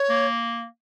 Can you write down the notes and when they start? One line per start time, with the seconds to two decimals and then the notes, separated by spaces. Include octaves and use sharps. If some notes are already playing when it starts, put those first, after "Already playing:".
Already playing: C#5
0.09 A#3